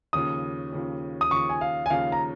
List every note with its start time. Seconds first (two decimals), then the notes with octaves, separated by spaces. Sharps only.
0.13 D#2 C#3 F3 D#6
0.72 D#2 C#3 F3
1.21 D#6
1.31 D#2 C#3 F3 C#6
1.49 G#5
1.61 F5
1.86 G#5
1.90 D#2 C#3 F3 F5
2.12 A#5